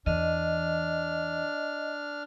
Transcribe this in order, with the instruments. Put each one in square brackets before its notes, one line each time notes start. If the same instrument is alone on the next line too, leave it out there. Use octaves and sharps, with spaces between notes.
[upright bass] E2 E3 [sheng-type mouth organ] D4 F6 [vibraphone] D#5